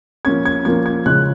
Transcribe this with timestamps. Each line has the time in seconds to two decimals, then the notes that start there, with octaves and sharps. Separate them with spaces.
0.25 F3 A#3 C#4 G#6
0.45 G#6
0.65 F3 A#3 C#4 G#6
0.86 G#6
1.06 C#3 F3 G#3 C#4 F#6